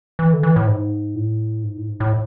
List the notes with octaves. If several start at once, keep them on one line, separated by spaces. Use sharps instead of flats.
E3
D3
E3
A2
G#2
A2
G#2
A2
G#2
A2